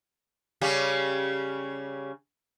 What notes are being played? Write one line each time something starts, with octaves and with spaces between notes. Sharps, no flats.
C#3 G3 C#4